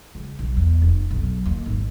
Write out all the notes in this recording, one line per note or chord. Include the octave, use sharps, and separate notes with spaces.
C#2
B1
E2
F1
B1
D#2
G#1